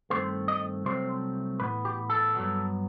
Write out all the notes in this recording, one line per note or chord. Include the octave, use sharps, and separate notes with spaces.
G2 D#3 A3 C4 C5
D#5
C2 C3 F#3 A3 C4 C5
A2 E3 B3 B4
G4
A4
G2 F#3 B3